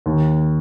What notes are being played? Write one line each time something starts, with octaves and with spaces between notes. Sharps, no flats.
D#2